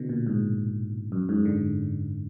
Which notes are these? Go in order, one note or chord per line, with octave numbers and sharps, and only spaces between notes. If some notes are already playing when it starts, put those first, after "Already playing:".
Already playing: B2 D3
A#2
G#2
F#2
G#2
D3